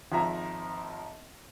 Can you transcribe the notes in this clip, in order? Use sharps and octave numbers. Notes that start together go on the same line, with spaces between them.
G#1 F3 E5 A#5